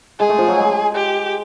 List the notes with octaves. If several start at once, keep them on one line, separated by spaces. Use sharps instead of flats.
G#3 G#4
A3
F3
F#3
G#3
G4